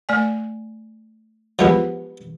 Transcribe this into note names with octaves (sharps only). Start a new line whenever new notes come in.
A3 D5 G#5
F3 G#3 B3 G4 B4 F#5